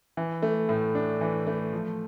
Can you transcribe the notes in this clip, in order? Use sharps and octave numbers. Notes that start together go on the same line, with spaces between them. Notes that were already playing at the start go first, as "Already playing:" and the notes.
E3
A3
A2
D4
E3
A3
F3